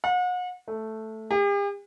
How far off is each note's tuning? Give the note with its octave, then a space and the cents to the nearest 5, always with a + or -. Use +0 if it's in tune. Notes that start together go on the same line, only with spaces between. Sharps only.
F#5 -40
A3 +0
G4 +45